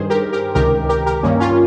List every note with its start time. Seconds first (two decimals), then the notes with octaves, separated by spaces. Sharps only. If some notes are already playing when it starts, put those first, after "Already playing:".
Already playing: G2 D#3 G#4 C5
0.10 G4 A#4
0.33 G4 A#4
0.55 C#2 C3 D#3 G4 A#4
0.89 G4 A#4
1.06 G4 A#4
1.23 G2 D#3 A#3 C#4
1.40 C#4 F4